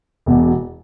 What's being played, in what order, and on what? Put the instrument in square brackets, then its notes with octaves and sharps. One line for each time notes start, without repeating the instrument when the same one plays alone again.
[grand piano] E1 E2 B2